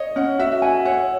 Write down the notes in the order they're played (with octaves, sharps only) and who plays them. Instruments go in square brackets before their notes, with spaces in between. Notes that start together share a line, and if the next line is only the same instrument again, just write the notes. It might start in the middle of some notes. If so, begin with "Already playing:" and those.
Already playing: [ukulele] C#5 [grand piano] D#5
[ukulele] C#4 [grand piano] F#5
[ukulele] F#4 [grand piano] E5
[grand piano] F#5 [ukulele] G#5
[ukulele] C#5 [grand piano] F#5